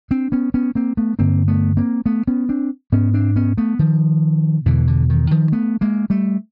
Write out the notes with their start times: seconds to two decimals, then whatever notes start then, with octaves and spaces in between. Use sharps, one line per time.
0.11 C4 D4
0.32 B3 C#4
0.54 B3 C#4
0.75 A#3 C4
0.97 A3 B3
1.19 G2 D3 A#3 C4
1.48 A3 B3
1.77 A#3 C4
2.06 A3 B3
2.28 B3 C#4
2.49 C4 D4
2.92 G#2 B3 C#4
3.14 C4 D4
3.36 B3 C#4
3.58 A3 B3
3.79 D#3 F3
4.66 E2 B2 D3 E3
4.87 D3
5.10 D#3
5.31 D#3 F3
5.52 A3 B3
5.81 G#3 A#3
6.10 G3 A3